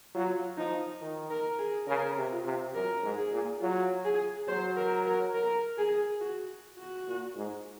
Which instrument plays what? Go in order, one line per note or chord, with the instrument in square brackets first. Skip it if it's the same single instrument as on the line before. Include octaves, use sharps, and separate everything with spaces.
[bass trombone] F#3 [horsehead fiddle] F4
[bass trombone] F3 [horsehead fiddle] D#4
[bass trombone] D#3
[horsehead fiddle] A#4
G#4
[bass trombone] C#3 [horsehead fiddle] A#4
[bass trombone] C3
[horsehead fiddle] F4
[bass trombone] C3
[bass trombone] F#2 [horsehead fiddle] A#4
[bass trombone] G#2
[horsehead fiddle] G#4
[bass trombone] A#2
[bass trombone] F#3 [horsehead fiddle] F4
[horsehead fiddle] G#4
[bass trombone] F#3 [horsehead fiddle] C5
[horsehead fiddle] A#4
A#4
A#4
G#4
F#4
F#4
[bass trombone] A#2
G#2